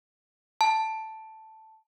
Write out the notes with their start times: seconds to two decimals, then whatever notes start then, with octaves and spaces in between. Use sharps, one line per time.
0.61 A5